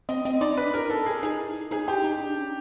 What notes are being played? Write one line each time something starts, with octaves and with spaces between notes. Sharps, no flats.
C4 D#5
C4 D#5
D#4 D5
D4 B4
E4 A#4
D#4 A4
G#4
D#4 G#4
E4
D#4
D#4 G#4
E4 G4
D#4
D4
C#4